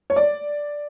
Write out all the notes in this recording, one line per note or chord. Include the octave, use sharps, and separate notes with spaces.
C#5
D5